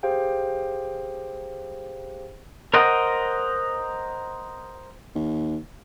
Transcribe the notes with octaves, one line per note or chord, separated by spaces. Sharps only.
G4 G#4 C5 F5 G5
A#4 C5 D#5 F#5 G5
D#2